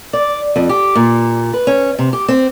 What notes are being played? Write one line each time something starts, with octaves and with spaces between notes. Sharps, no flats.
D5
F2
G4
A#2
B4
C#4
C3
G4
C4